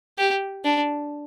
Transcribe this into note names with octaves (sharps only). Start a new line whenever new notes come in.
G4
D4